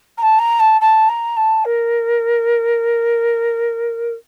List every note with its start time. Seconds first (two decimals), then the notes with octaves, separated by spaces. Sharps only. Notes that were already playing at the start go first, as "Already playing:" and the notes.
0.18 A#5
0.22 A5
0.39 A#5
0.60 A5
0.81 A5
1.09 A#5
1.37 A5
1.65 A#4